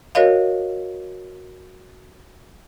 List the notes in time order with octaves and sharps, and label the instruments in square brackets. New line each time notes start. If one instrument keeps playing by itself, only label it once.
[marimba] F#4 A#4 C#5 D#5 F5